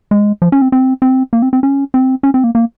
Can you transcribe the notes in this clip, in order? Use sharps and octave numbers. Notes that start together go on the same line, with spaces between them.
G#3
F3
C#4
C4
C4
C4
A#3
C4
C4
C#4
C4
C#4
C4
A#3
A#3